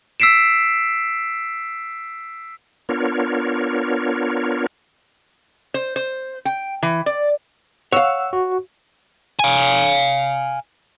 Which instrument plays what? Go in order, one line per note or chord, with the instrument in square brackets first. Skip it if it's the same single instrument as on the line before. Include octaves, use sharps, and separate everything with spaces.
[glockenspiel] E6 B6 C7 D7 E7
[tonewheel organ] B3 D4 F4 A#4 C#5
[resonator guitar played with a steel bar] C5
C5
G5
E3
D5
[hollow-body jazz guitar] C#5 F5 [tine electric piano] F#5 E6
[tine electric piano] F#4
[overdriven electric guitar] F5 G#5